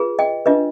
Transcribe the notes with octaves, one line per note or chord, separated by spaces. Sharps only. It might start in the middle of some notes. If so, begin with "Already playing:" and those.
Already playing: F4 G#4 B4
D#5 G5
D4 F4 B4 D#5